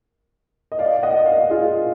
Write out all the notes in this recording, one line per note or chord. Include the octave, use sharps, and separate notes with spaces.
D#5
D5 F5
D#5 F#5
D#5
D5 F5
F4 G#4